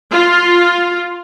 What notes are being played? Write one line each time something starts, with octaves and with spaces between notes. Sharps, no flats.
F4